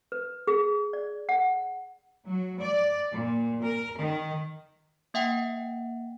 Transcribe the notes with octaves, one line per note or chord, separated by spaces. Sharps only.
B4
G#4
D5
F#5
F#3
D5
A#2
A#4
D#3
A#3 E5 F#5 G5